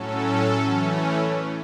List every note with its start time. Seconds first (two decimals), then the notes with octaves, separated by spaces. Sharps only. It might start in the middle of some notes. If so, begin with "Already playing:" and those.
Already playing: A2 F#3 C#4 A4
0.55 E3 A3 C#4